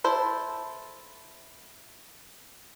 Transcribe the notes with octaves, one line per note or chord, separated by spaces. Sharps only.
E4 A4 C5